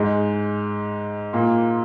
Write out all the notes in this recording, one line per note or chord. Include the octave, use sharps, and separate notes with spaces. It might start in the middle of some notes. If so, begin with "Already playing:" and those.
Already playing: G#2 G#3
A#2 A#3